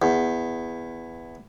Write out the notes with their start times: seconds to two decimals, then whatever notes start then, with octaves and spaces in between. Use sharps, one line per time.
0.02 E2